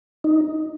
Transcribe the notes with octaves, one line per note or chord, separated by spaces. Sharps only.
D#4